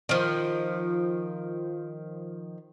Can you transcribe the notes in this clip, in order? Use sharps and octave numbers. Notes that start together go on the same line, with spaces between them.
D#3 F3